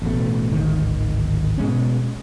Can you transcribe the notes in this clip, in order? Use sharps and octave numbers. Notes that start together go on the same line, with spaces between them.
A1 B2 A3
D1 G#1 D#3
B2 G#3 C#4